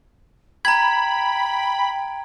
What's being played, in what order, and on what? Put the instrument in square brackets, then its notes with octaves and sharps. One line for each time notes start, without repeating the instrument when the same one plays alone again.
[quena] G5 [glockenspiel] A#5 G#6 [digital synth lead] B5